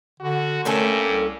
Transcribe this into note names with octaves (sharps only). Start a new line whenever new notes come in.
D3 F#4
G2 A3 A#3 C#4 A4
C2